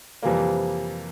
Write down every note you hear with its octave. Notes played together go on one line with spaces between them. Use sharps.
F2 C3 E3 G3 A#3